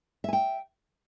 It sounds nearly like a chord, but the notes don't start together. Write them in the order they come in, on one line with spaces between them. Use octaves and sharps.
E5 G#5 G5